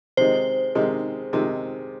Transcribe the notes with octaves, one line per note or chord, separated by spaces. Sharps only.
C3 D#3 G#3 C5
C3 D#3 G#3
C3 D#3 G#3